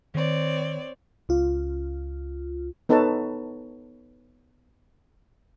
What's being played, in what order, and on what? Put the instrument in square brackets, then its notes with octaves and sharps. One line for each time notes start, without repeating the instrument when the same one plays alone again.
[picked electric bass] D#3 [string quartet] C4 C#5 D5
[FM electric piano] C#2 F4
[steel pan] B3 D#4 A4 B4 C#5 A5